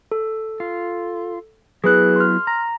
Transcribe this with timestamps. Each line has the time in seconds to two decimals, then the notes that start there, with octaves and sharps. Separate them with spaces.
0.12 A4
0.60 F4
1.84 F#3 B3 E4 G#4 B4 F#6
2.16 C6 F6
2.47 A#5